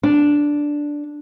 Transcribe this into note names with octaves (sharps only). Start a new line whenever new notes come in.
D4